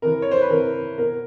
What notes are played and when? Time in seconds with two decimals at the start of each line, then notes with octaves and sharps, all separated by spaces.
0.02 C3 E3 A#4
0.22 C#5
0.31 C5
0.41 B4
0.50 C3 E3 A#4
0.98 B2 A#4